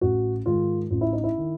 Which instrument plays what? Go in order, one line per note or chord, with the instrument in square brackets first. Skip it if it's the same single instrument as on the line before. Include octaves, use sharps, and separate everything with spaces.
[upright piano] A1 F#4
G#2 D#3 F4
A1 F4
E4
D#4
E4
D#3